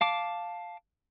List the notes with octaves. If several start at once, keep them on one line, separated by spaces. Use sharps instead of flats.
F5 A5 D6